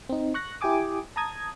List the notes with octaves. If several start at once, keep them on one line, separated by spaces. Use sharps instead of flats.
C4 D#4
C#6 F#6 A#6
E4 G4 G5 G#5 D6 D#6
A5 A#5 D#6 G#6